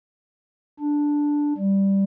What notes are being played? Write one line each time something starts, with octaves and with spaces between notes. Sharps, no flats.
D4
G3